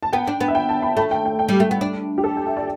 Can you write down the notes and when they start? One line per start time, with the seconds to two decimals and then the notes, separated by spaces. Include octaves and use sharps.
0.03 A5
0.13 B3 G5
0.27 D4
0.41 B3
0.48 E5
0.55 G5
0.69 A5
0.82 B5
0.97 A3 A5
1.11 G5
1.25 G5
1.39 G5
1.49 G3
1.60 A3
1.71 B3
1.81 D4
2.18 G4
2.24 A4
2.37 G5
2.46 E5
2.57 D5